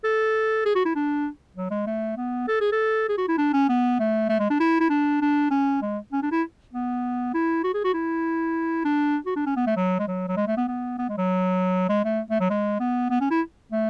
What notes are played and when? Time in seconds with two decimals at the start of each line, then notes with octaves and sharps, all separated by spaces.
0.04 A4
0.66 G#4
0.75 F#4
0.85 E4
0.95 D4
1.57 F#3
1.71 G#3
1.87 A3
2.17 B3
2.48 A4
2.61 G#4
2.72 A4
3.09 G#4
3.18 F#4
3.28 E4
3.38 D4
3.53 C#4
3.69 B3
4.00 A3
4.29 A3
4.39 G#3
4.50 D4
4.60 E4
4.81 E4
4.90 D4
5.21 D4
5.51 C#4
5.82 G#3
6.12 C#4
6.23 D4
6.32 E4
6.73 B3
7.34 E4
7.64 F#4
7.74 G#4
7.84 F#4
7.94 E4
8.85 D4
9.26 F#4
9.36 D4
9.46 C#4
9.56 B3
9.67 A3
9.77 F#3
9.99 G#3
10.08 F#3
10.28 F#3
10.37 G#3
10.47 A3
10.57 B3
10.68 B3
10.99 B3
11.09 G#3
11.18 F#3
11.89 G#3
12.04 A3
12.30 A3
12.40 F#3
12.50 G#3
12.80 B3
13.10 B3
13.21 C#4
13.31 E4
13.72 A3